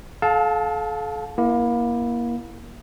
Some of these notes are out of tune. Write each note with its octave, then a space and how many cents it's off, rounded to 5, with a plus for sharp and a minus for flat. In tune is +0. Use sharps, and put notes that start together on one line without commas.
A4 -40 F5 +25 A5 +0
A#3 +30 E4 +0